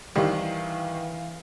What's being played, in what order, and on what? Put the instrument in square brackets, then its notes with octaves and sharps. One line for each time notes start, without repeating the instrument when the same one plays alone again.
[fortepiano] C2 [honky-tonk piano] D#3 [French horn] E3 [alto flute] F5